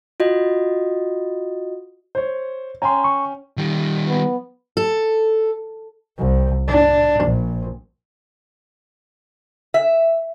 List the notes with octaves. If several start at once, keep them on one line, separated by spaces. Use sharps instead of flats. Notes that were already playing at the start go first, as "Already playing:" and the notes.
F4 F#4 D#5
C5 C#5
C#4 G5 G#5 A#5 C6
C#6
D#3 G3
B3
A4
C2
D4
A#1
E5